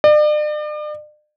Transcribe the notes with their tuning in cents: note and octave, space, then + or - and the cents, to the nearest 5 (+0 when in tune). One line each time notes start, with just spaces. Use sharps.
D5 +40